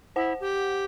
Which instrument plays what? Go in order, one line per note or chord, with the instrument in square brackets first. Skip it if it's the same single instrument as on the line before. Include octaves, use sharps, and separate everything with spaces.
[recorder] E4 [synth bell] C5 F#5
[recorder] G4